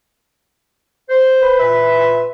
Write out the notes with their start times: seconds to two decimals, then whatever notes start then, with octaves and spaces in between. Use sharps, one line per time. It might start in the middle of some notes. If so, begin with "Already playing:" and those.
1.09 C5
1.42 B4
1.60 A#2 E5